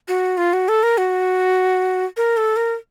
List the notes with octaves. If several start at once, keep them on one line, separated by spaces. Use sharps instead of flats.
F#4
F4
F#4
A4
A#4
F#4
A#4
A4
A#4